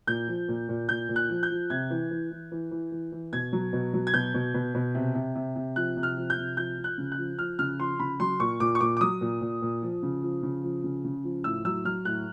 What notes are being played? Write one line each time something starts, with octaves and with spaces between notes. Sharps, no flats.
A#2 G6
F3
A#2
A#2
A#2 G6
A#2
F#6
F3
G6
F3
C3 G#6
E3
E3
E3
E3
E3
E3
E3
B2 G#6
F#3
B2
F#3
G#6
B2 G6
B2
B2
B2
C3
C3
C3
C3
F3 F#6
C3
F6
F3
G6
C3
F3 G6
F3
F#6
C#3
F#6
F3
F3 F6
C#3 F6
F3 C6
C#3 B5
F#3 C6
A#2 C#6
A#2 D6
C#6
A#2 D6
D6
F#3 D#6
A#2
A#2
A#2
F3
C#3
F3
C#3
F3
C#3
C#3
F3
A2 E6
F#3 E6
F#3 F6
A2 F#6